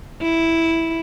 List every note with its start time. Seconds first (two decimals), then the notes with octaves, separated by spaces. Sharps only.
0.22 E4